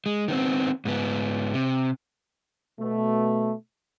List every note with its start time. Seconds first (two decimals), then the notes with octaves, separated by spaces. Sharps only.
0.06 G#3
0.28 D#3 B3 C4
0.85 G#2 B3
1.54 C3
2.79 B2 A3